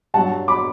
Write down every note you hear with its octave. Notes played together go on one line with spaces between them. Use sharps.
G2 F#3 F#5 A5
B5 D6